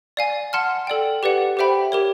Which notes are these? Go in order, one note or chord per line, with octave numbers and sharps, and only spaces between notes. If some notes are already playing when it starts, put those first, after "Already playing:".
D5 F5 G#5
F#5 A5 C6 F6
A4 D5 G5
G4 B4 D5 F#5
G4 C5 E5 G5 B5
G4 A#4 C#5